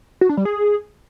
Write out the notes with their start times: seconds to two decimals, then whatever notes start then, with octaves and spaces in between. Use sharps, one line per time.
0.21 F#4
0.29 D4
0.37 G3
0.45 G#4